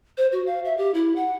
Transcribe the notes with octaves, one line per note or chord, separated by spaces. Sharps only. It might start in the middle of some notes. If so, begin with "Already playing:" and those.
C5
F#4
F5
E5
G4
E4
F#5